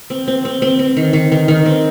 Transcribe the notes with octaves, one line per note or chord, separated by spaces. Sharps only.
C4
C4
C4
C4
C4
D#3
D#3
D#3
D#3
C4